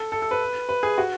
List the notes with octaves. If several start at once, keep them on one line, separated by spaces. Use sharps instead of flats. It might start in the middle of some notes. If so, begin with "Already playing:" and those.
Already playing: A4
A4
A4
B4
B4
G#4
F#4